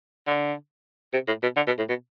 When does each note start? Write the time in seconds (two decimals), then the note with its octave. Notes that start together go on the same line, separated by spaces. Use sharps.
0.27 D3
1.13 C3
1.28 A2
1.42 B2
1.56 D3
1.67 B2
1.78 A2
1.89 B2